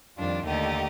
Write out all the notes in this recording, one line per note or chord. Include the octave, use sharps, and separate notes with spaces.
F2 D#3 G3 D4 F4
D#2 D3 A3 D#4 G4